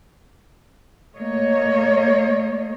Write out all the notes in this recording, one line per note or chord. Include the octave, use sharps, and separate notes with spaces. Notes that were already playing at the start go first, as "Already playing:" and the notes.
A3 A#3 C#5 D#5